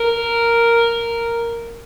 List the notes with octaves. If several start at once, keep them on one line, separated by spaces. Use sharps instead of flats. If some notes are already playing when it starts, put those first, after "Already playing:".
Already playing: A#4